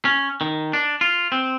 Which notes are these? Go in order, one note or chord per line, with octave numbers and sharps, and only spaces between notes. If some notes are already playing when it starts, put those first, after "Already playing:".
C#4
D#3
D4
F4
C4